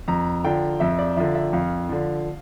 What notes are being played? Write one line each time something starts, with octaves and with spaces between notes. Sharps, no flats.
F2 A#5
D3 F3 G5
F2 E5
D5
D3 F3 E5
E5
F2 F5
D3 F3